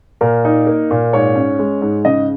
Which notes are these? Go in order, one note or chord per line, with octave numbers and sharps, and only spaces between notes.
A#2 A#4
D#4
A#3
A#2
G#2 C#5
C#4
G#3
G#2
C#3 D#5